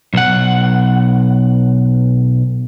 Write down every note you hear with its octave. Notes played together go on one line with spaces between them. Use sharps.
B1 F#5